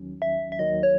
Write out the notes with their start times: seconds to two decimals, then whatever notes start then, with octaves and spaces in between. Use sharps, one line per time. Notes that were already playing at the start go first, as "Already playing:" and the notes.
Already playing: D#2 D#3 F#3 C#4
0.22 E5
0.52 E5
0.59 D#2 D#3 F#3 D#5
0.83 C#5